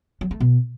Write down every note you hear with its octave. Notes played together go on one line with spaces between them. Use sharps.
F#3
A3
B2